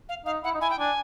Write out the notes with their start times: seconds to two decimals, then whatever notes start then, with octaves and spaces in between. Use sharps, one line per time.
0.09 F5
0.26 D#4 F5
0.44 E4 F#5
0.54 D#4
0.61 E4 G#5
0.70 G5
0.79 D4 G#5